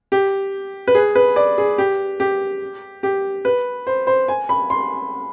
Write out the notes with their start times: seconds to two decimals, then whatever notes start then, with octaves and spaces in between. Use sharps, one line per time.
0.12 G4
0.88 B4
0.95 G#4
1.15 B4
1.36 D5
1.58 G#4
1.78 G4
2.20 G4
3.03 G4
3.45 B4
3.87 C5
4.07 C5
4.28 G#5
4.49 B5
4.70 C6